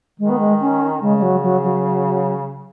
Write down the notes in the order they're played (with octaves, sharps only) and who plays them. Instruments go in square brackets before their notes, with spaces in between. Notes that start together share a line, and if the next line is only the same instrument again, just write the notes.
[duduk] D#3 [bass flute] G#3
[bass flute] B3
G#3
C#4
[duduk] C#3 [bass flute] G#3
[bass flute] G#3
F#3
F#3
F#3